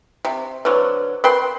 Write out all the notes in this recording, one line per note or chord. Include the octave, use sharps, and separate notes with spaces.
C3
D3 F#3 B4 C5
A#4 B4 G5 C6